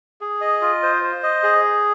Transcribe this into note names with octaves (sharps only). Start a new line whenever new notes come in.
G#4
D#5
F4
C5
C5
D#5
G#4